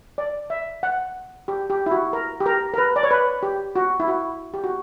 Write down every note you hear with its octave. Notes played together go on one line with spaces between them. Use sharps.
D5
E5
F#5
G4
G4
E4
F#4
A#4
G4
A#4
A#4
B4
D5
C#5
B4
G4
F#4
E4
F#4
G4
F#4